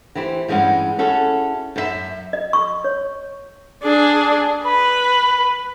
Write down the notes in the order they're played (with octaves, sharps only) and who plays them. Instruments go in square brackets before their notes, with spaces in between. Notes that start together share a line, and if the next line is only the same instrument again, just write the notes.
[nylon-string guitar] E3 E4 G4 C5
G2 E3 G#3 C#4 F#5
C#4 E4 F#4 G#4 A4
F#2 A#4 E5
[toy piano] D#5
C#6
C#5
[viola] D4 G#4
[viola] B4 [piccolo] B5